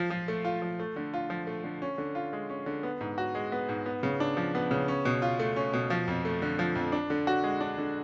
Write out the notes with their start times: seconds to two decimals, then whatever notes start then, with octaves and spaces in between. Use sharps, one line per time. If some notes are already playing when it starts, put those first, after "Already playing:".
Already playing: F3 F4
0.10 F3
0.28 A3
0.45 F4
0.62 F3
0.80 A3
0.96 D3
1.14 F4
1.30 F3
1.47 A3
1.64 D3
1.82 C#4
1.98 D3
2.15 F4
2.33 G#3
2.50 C#4
2.66 D3
2.83 B3
3.01 G#2
3.18 F#4
3.35 G#3
3.52 B3
3.69 G#2
3.86 B3
4.03 C#3
4.20 D4
4.37 F3
4.55 B3
4.71 C#3
4.88 C#4
5.05 B2
5.22 F4
5.39 A3
5.56 C#4
5.73 B2
5.90 F3
6.08 F2
6.25 A3
6.42 D3
6.59 F3
6.75 F2
6.92 D4
7.10 D3
7.27 F#4
7.44 G#3
7.61 D4
7.78 D3